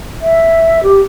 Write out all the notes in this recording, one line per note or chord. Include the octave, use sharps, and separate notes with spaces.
E5
G4